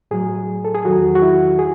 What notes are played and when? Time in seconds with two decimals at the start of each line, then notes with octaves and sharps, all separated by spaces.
0.11 A2 F#3 G#4
0.65 A4
0.75 G#4
0.85 E2 D#3 F#3 F#4
1.15 F#4
1.22 E4
1.59 G#4